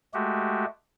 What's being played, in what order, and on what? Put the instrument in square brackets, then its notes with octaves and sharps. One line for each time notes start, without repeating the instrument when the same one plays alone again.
[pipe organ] G#3 A3 F#4 G4